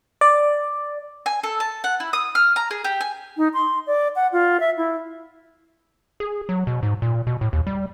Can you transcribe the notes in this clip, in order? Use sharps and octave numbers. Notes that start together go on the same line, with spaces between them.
D5
G#5
A4
A5
F#5
E4
D#6
F6
A#5
G#4
G4
G#5
D#4
C6
D5
F#5
F4
E5
E4
G#4
F#3
B2
G#2
A#2
B2
A2
D#2
G3